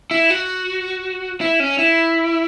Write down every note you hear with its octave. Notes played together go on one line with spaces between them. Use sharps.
E4
F#4
E4
C#4
E4